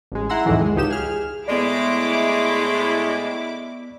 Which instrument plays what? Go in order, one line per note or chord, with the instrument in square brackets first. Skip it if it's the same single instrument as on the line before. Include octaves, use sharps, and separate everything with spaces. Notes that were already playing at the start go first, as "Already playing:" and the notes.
[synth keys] A1 G#3
E4 F#5 A#5 C6 E6
C2 F2 A2 D#3 E3 F#3
G#3
C#2 D#4 G4 E7
G#4 F6
[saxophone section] A2 G#3 [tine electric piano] B3 D5 [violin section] E4 D6